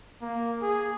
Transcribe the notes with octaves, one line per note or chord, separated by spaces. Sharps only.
A#3
G#4